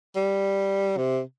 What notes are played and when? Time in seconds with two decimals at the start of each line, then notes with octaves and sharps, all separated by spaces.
0.16 G3
0.97 C3